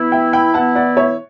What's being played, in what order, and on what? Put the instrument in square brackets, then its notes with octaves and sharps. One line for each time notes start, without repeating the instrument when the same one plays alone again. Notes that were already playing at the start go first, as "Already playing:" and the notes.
Already playing: [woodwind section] E3 B3 E4
[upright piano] E5 G5
G5 B5
[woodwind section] E3 B3 E4 [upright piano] F#5 A5
[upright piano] D5 F#5
C#5 E5